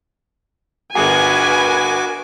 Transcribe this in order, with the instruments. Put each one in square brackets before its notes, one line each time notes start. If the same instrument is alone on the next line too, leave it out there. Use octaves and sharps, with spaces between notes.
[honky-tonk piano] G1 G#4 [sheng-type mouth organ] F#4 D6 [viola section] A#4 B4 G#5